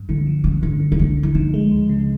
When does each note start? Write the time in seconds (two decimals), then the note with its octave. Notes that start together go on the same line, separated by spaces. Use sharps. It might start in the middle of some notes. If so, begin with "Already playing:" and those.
Already playing: G2
0.09 D3 E4
0.27 F3
0.44 G2 C#4
0.62 D3 C#4
0.80 D3
0.92 D#4
0.99 D3 D4
1.17 D3
1.23 E4
1.35 F3 D#4
1.54 G#3
1.71 C#2
1.89 C#3